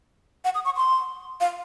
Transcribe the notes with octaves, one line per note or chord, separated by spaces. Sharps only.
F#5
D#6
C#6
C6
F5